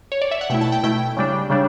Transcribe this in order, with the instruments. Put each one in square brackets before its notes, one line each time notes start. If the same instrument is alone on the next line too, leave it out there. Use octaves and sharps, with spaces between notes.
[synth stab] C#5
D5
E5
F#5
B2 A3 E4 G5
A5
G5
B2 A3 E4 G5
C#3 G3 D4
C#3 G3 D4